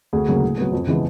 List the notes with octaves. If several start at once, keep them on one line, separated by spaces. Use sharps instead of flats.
D2 G#4
C#3 F#3 A#3
A2
F#3 B3
F2
C#3 E3 G#3 B3